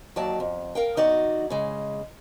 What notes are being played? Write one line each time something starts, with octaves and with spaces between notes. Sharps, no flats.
D#2 D#3 F#3 D5 A5
F2
A#4 F5 G5
E2 D#4 F#4 D5
C#3 G#3